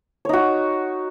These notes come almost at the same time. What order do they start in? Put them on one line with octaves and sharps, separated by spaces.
C#5 D#4 F#4